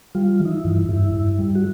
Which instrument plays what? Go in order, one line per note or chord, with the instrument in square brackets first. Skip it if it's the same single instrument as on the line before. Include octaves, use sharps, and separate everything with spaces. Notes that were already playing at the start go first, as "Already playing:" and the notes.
[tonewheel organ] G3 F4
E3
D#4
E4
G2
G2 E4
G2
G3
F#4